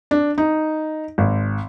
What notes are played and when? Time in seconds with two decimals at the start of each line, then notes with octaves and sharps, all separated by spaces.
0.11 D4
0.38 D#4
1.18 G#1